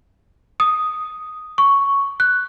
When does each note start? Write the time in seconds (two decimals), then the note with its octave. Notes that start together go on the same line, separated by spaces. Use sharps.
0.60 D#6
1.58 C#6
2.20 F#6